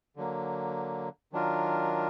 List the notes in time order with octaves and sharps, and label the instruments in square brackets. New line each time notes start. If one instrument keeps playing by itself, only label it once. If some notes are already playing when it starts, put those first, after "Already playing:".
[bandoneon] D3 F#3 A#3
D#3 F#3 D4 F4 A#4